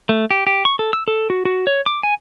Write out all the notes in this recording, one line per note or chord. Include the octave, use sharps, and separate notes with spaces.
A3
G4
G4
C#6
A4
E6
A4
F#4
F#4
C#5
D6
G#5